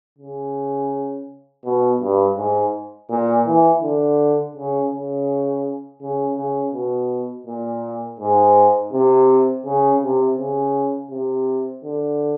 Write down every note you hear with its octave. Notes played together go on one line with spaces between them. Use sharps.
C#3
B2
G2
G#2
A#2
E3
D3
C#3
C#3
C#3
C#3
B2
A#2
G#2
C3
C#3
C3
C#3
C3
D3